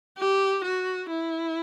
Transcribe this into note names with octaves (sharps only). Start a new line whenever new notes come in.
G4
F#4
E4